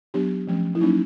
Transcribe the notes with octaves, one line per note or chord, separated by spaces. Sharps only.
F#3 B3 D4 G4
F3 A3 C#4
E4
F#3 A#3 C#4 D#4